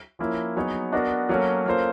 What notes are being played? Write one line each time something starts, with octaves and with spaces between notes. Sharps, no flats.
F3 A#3 C#4 E4
F#3 B3 D#4 G#4 C#5
B3 D4 F#4 A#4 D#5
F#3 A#3 C#4 F#4 A4
A#3 C#4 F4 A4 C5